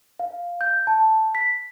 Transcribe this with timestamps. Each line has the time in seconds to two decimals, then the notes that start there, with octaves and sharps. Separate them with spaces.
0.20 F5
0.61 G6
0.87 A5
1.35 B6